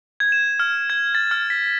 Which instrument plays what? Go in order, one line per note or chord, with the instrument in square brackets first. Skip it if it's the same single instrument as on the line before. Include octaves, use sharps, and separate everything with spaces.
[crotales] G#6
E7
F6
G#6
A6
F6
B6